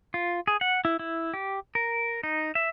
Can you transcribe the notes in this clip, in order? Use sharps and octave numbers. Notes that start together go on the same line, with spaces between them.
F4
G#4
F#5
E4
E4
G4
A#4
D#4
E5